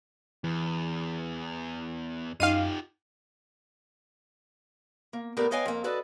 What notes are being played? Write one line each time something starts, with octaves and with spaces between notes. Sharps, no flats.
E2 E3
F#2 D#4 F4 G4 D#5 F5 C7 D#7
A#3
A2 B3 G4 A#4 D5
B4 C#5 D#5 F5 G5 G#5
F2 A#3
F#4 A4 B4 D5 D#5